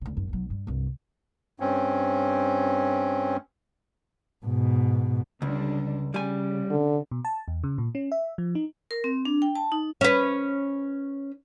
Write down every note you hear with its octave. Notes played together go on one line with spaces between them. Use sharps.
D2 C#3
G#1 F#2
B1 F#3
G2
C2 G2
G2 C4 C#4
G#2 B2
C#2 D3 G3 D4
C#3 G3 G#5
D3
B2
A5
E2
C#3
A#2
C#4
E5
F3
D#4
A#4
C4
D4
G5
A5
D#4
C#4 B4